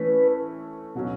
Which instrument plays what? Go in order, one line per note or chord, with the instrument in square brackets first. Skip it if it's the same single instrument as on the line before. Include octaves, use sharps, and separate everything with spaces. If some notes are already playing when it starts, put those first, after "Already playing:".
Already playing: [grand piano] E3 A3 C#4 [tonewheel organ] B4
[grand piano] B2 F#3 C#4